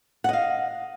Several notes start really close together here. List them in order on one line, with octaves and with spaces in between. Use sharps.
F#5 D#5 F5